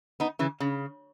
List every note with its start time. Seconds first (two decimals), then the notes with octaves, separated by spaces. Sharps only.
0.20 B3 D#4
0.39 C#3 E3
0.60 C#3